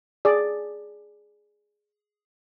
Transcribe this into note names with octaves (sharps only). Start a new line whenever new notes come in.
G#4 D5